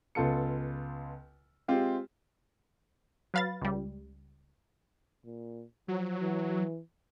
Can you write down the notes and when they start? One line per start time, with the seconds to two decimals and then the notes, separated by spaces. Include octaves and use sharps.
0.15 C#2 B3 F4 A4 C#7
1.68 G#3 C4 F4 G4
3.34 F#3 B4 F5 B5 A6
3.62 C#2 G3
5.26 A#2
5.88 F3 F#3
6.21 E3